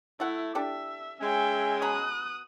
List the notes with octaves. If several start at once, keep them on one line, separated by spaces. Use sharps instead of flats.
A3 E4 F#5
D4 G4 A4 E5
G#3 C#4 E5 G5
B2 A#5 B5 D#6 F#6